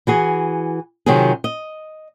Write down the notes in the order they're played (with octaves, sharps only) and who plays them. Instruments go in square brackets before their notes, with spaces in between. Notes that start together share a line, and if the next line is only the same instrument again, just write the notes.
[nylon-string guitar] E3 F#4 G#4
C3 D#3 F#3 C4 F4 G#4
D#5